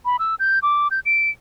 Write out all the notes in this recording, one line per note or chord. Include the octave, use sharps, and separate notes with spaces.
B5
E6
G6
D6
G6
D7